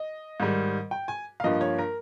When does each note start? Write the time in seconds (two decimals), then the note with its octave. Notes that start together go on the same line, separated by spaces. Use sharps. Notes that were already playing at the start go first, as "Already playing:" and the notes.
Already playing: D#5
0.40 G#2 D#3 G3
0.91 G5
1.08 G#5
1.40 F5
1.43 G2 F3 A#3 D#5
1.61 C#5
1.78 A#4